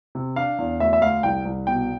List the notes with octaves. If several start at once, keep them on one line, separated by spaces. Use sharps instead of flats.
C3
D4 F5
E2
D2 E5
E5
D2 F5
C2 G5
C2
B2 G5